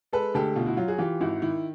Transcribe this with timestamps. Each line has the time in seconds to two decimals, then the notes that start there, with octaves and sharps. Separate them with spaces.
0.13 G#3 A4 B4
0.34 D2 G4 A4
0.56 B2 F4
0.66 E4 F#4
0.77 F#3 F4
0.88 F#4 G#4
0.98 E3 F4 G4
1.21 G#1 E4 F#4
1.42 D#3 E4